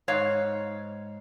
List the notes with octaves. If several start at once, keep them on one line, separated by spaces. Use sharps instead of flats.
G#2 C#5 F5